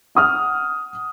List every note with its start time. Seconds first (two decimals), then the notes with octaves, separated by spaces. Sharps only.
0.15 F#5 D#6 F6